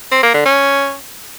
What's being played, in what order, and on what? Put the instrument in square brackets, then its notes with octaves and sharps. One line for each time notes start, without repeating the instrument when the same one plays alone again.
[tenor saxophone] C4
A#3
D3
C#4